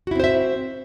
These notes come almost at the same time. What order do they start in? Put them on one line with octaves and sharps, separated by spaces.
F#4 E4 C4 C5 E5